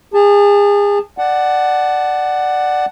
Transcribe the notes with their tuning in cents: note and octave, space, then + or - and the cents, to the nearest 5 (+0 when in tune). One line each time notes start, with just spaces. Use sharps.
G#4 -30 A5 +0
D5 +10 F#5 +10 A5 -15